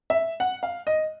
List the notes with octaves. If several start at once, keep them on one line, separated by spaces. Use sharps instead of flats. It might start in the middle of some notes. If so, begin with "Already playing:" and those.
E5
F#5
F5
D#5